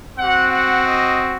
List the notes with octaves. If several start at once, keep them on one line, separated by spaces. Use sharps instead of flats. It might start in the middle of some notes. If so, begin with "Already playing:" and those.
C4 F#4 F#5
F#5
D#5